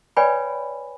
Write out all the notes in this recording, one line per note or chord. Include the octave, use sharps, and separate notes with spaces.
B4 C#5 D5 G5 G#5 B5